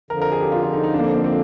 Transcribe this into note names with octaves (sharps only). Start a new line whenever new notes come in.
F2 D3 F3 A#4
A#4
G#4
G4
F4
F4
D#4
D#4
D4
A#3
C4
A#3
C4